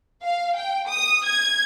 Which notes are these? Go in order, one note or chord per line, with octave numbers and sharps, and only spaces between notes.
F5
G5
D#6
G#6